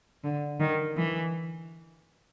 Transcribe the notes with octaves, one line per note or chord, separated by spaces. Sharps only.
D3
D#3
E3